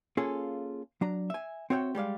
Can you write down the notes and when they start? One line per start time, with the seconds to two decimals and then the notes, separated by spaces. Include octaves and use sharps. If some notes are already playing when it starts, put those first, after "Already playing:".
0.17 A#3 C#4 F4 G#4 A4
1.01 F#3 D4 A#5
1.30 E5 G#5
1.70 C4 F#4 C#5 E5 F#5 G5
1.95 G3 G#3 D5 F5